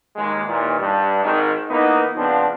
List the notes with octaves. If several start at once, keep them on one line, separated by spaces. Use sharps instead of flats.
D#2 G#3
D#2 A#2 E3
G2
G#1 G#2 D#3
E3 A#3 B3 D#4
C#3 F3 B3 C4 D4 F4